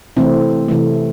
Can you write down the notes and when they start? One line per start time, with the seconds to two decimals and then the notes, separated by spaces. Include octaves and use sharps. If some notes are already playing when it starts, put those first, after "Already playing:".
0.17 C3 E3 A3 C4 E4
0.68 C3 E3 A3